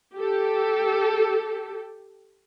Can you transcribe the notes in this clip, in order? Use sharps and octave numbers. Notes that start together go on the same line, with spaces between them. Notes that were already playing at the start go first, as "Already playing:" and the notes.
G4 A4